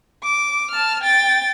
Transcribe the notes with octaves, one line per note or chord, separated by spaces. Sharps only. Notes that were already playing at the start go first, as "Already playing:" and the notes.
D6
A5 F6
G5 A6